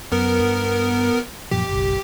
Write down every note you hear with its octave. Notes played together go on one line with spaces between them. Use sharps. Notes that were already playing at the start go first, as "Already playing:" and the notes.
F#2 B3 A#4
G2
F#2 A#2 F3 G4
F#1 B1